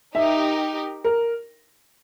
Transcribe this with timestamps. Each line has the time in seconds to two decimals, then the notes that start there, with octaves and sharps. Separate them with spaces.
0.14 D#4 G4 A#4 E5
1.04 A#4